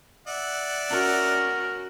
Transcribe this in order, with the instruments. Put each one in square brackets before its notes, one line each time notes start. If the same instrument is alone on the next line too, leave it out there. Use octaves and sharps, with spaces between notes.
[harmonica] D5 E5 F#5
[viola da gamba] C#4 F#4 [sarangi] A#4